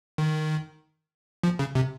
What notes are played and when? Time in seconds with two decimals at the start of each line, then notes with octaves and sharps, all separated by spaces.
0.18 D#3
1.43 F3
1.59 C#3
1.75 C3